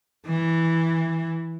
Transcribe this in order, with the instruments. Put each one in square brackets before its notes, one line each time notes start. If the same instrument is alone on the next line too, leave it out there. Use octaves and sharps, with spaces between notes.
[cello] E3